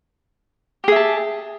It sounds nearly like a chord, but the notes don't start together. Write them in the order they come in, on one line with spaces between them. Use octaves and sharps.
G4 G#4 E5 A5